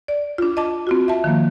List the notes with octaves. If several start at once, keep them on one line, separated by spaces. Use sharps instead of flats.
D5
D4 F4
D#5 A5 D6
C4 F4 F#4
E5 A5
D#3 F3 A#3